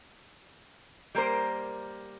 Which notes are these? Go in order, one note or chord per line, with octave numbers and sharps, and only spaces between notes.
G3 A#3 A#4 C5